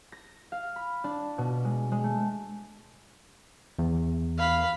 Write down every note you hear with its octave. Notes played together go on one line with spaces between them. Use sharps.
A#6
F5
B5
D4
B2
G#3
G#3
A3
E2
F5 B5